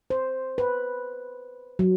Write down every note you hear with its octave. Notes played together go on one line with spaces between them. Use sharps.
C5
B4
F#3